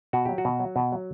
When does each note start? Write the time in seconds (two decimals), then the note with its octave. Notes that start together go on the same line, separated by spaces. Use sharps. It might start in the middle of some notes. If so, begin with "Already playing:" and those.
0.13 B2 F#4
0.25 F#3 G4
0.38 F#4
0.45 B2
0.60 F#3
0.76 B2
0.92 F#3